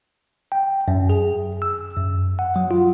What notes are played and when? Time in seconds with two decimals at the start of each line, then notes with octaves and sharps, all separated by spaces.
0.52 G5
0.88 F#2
1.10 G#4
1.62 E6
1.97 F#2
2.39 F#5
2.56 F#3
2.71 F4